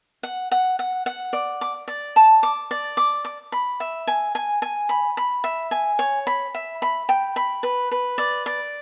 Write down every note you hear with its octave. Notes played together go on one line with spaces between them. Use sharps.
F#5
F#5
F#5
F#5
D5
D6
D5
A5
D6
D5
D6
D6
B5
E5
G#5
G#5
G#5
B5
B5
E5
G#5
C#5
B5
E5
B5
G5
B5
B4
B4
D5
D5